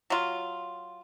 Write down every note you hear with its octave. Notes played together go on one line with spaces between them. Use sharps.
F#3 F4